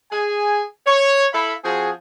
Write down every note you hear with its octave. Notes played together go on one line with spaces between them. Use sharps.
G#4 G#5
C#5
E4 A4 F5 B5
F3 C4 F#4 G#4